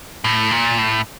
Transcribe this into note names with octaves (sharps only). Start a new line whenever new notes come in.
A2
A#2
A2